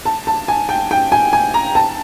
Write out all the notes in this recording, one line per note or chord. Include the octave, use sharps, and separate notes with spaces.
A5
A5
G#5
G5
G5
G#5
G#5
A#5
A5